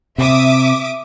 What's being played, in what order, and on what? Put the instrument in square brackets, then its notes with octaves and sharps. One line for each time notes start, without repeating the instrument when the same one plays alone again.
[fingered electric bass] C3 [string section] E5 D6 D#6